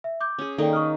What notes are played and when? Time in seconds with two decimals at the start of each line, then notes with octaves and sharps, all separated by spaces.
0.04 E5
0.21 D6 G6
0.39 C#4 G#4
0.58 D#3 A#3 D#4 A4 D5 G5
0.73 C#6 D#6 F6